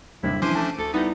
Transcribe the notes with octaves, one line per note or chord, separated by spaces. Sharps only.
G1 D#2 C3 E4
E3 F3 C#4 D4 C5 D6 D#7
A3 A5
D2 A4
G3 B3 D#4 E4